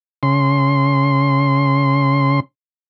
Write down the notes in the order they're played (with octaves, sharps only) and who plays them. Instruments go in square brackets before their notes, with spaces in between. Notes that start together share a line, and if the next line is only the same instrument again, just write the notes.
[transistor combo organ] C#3 C6